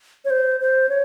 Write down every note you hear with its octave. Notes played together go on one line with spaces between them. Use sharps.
C#5
C5
C5
C#5